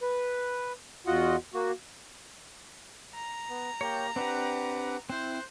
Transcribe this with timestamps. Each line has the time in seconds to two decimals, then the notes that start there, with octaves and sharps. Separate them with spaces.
0.01 B4
1.07 E2 F4 F#4 D#5 F#5
1.54 A#3 F#4
3.14 A#5
3.49 B3
3.81 A#3 G4 C#5 G5
4.16 C4 D4 G4 B4 F#5 D6
5.10 C4 E4 C5 F#6